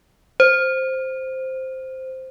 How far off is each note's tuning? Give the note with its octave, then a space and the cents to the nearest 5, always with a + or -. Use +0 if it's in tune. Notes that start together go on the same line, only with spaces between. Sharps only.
C5 +0